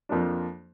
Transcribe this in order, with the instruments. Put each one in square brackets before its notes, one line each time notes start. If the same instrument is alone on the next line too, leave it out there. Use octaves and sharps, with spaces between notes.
[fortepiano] F2 F3 A#3 D4